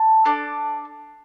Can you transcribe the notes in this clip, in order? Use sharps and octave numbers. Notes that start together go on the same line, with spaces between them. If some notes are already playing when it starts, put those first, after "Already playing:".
Already playing: A5
D4 A4 D5